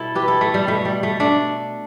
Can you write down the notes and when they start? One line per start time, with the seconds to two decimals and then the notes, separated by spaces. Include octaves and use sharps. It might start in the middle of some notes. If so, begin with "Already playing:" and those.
Already playing: B2 G3 E4 A4
0.15 G4 B4
0.28 E4 A4
0.41 A3
0.54 G3
0.67 B2 G3 A3
0.85 G3
1.03 A3
1.20 A3 D4